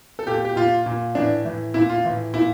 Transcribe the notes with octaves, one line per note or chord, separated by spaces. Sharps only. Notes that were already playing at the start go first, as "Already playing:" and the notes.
A4
A#2 G4
G4
A#2 F4
A#2
A2 E3 D4
A2 E3
A#2 E4
F4
A2 E3
A#2 E4